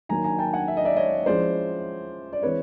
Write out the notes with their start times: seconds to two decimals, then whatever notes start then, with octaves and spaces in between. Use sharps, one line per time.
0.09 D#3 F#3 A#3 D#4 G#5 A#5
0.24 G#5 A#5
0.39 G5 A5
0.53 F#5 G#5
0.68 E5
0.77 D#5
0.85 D5 E5
0.97 C#5 D#5
1.26 F3 G#3 C#4 E4 C5 D5
2.33 D5
2.43 E3 G#3 C4 B4 C#5